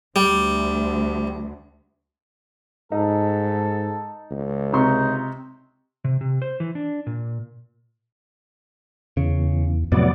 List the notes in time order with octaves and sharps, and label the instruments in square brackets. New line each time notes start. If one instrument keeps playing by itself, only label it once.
[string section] D2 [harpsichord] G3
[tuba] G#2 [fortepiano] D#4 [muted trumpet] A4
[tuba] C#2
[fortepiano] C3 C6 C#6 [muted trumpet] D#4
[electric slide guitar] C3
C3
C5
E3
D4
A#2
[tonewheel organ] E2 [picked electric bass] C#3
[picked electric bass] F2 A2 C3 [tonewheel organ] F#3 B3 D5